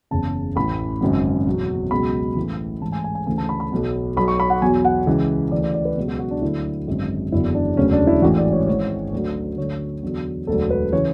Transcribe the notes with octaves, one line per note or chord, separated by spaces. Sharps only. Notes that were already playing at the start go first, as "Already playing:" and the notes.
F#1 E2 C#3 A5
A1 A2 E3 B5
G#1 F#2 C#3 F#3
E2 B2 F#3
C#2 B2 F#3 B5
A1 A2 E3
A1 G#2 E3 A5
G#5
G#5
G#5
D2 C#3 E3 G#5
A5
B5
B5
B1 B2 F#3
B1 B2 F#3 B5
C#6
B5
F#5
E2 B2 F#3 G#5
F#5
C#2 C#3 E3
D2 C#3 E3 D5
D5
D5
B4
C#2 B2 F#3
F#4
F#4
D4
D2 D3 F#3 E4
G#1 F#2 D3
F#1 E2 D3 F#3 E4
D4
E1 D2 C#3 F#3 C#4
D4
E4
A1 G#2 E3 F#4
D5
C#5
G#1 G#2 E3 C#5
D2 D3 F#3
D2 D3 F#3 C#5
E2 D3 F#3
E1 D2 D3 F#3 A4
B4
C#3 E3 C#5